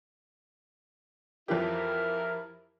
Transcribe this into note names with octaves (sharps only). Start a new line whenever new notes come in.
F2 E3 E4 G4 A#4